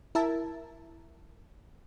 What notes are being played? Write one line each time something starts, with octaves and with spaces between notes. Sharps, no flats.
E4 A#4 E5 A5